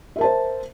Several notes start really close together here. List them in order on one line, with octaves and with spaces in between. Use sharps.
E5 A#4 A5 C5